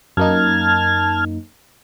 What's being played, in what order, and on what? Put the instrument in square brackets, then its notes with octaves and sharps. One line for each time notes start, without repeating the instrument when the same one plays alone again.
[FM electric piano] F#2 A#3 D#4 [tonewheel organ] A5 F6 G#6